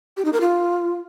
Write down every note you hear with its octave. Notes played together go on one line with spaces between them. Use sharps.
G4
D#4
A#4
F4